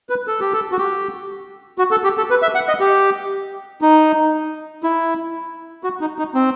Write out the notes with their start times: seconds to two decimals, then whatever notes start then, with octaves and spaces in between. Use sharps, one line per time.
0.10 B4
0.27 A4
0.40 G4
0.53 A4
0.72 F#4
0.77 G4
1.78 F#4
1.91 A4
2.04 G4
2.18 A4
2.30 B4
2.42 E5
2.55 F#5
2.68 D#5
2.80 G4
3.81 D#4
4.83 E4
5.84 F#4
6.01 D#4
6.19 D#4
6.34 C4